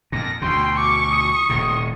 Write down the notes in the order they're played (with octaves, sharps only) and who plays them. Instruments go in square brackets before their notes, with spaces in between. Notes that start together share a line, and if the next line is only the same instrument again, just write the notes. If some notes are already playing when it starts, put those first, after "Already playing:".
[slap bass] F2 A#2 [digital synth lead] A#6
[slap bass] D2 B2 [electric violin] G5 [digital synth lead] C6
[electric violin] C#6 [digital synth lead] D6
[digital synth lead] D#6
[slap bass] D#1 A2 C3